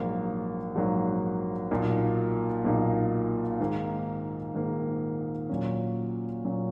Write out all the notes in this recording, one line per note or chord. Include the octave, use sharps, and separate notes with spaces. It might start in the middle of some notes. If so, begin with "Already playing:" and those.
Already playing: A#1 G#2 F#3 A#3
A#1 G#2 F#3 A#3
B1 A#2 A#3 D#4
B1 A#2 A#3 D#4
G#2 D#3 A#3
G#2 D#3 A#3
A#2 F#3 C#4
A#2 F#3 C#4